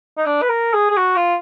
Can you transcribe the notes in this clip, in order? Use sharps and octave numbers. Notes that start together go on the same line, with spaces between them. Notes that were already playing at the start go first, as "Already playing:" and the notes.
D#4
D4
B4
A#4
G#4
G#4
F#4
F4